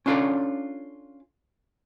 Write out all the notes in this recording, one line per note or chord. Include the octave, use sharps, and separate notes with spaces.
C#4 D4 F4 A4 C#5 D5